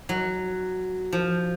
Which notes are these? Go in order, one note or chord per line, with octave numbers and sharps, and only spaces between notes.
F#3
F3